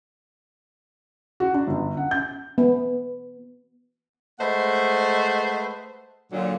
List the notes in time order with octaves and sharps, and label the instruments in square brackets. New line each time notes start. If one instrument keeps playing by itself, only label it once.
[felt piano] F#4
D4
G1
F#5
G6
[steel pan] B3
[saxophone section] G#3 A3 B4 C5 D#5 F#5
A#2 D3 F#3